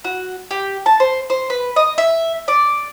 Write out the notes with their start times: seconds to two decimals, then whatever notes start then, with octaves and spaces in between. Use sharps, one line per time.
0.04 F#4
0.51 G4
0.86 A5
1.00 C5
1.30 C5
1.50 B4
1.76 D#5
1.98 E5
2.48 D5